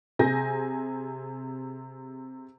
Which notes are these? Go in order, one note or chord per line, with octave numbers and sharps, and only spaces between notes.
C3 G#4 G#5 G6 A#6